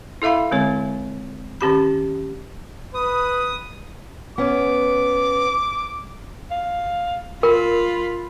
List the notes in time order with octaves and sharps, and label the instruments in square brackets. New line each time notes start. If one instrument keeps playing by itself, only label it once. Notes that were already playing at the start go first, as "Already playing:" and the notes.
[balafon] E4 A4 E5 F5 B5
D3 G#3 C4 C#5
D#3 C#4 G4 B5
[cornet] B4 [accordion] D#6
[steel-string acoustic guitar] B3 C#4 [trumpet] D6
[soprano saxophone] F5
[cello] F4 [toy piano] A#4 [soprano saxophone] B5